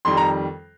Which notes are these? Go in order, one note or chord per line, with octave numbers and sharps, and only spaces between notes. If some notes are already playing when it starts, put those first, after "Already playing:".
F2 D#3 G3 C6
A#5